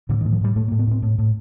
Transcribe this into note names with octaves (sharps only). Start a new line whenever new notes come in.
A2 D3
D#3
A2
F3
A2 G3
A2 A3
A#3
A2
B3
A2 C4
A2
A2